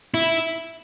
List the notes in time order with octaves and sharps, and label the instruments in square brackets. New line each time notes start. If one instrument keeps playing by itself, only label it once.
[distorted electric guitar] E4